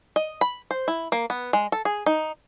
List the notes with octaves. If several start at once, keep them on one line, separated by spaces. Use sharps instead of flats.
D#5
B5
C5
E4
A#3
B3
G#3
A4
G#4
D#4